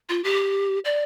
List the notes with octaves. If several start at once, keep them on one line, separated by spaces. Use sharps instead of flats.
F4
G4
D5